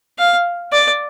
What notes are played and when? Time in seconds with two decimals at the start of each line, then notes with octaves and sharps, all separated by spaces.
0.18 F5
0.72 D5